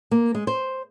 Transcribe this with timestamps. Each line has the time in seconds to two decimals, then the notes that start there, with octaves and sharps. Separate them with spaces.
0.11 A#3
0.35 G#3
0.47 C5